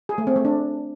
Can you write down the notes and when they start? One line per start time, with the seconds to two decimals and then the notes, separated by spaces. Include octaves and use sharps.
0.09 G#4
0.18 A3
0.27 C4
0.36 A3
0.45 D4